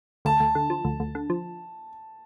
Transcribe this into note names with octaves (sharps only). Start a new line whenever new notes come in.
D2 A5
D2
D3
F3
D2
D2
D3
F3